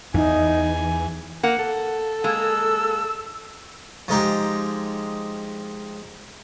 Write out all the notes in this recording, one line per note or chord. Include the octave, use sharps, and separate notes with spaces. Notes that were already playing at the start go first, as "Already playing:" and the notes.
E2 E3 D#4 G#5
A#3 F#5
A4
G#3 A#3 E6
F3 G#3 D#4 G4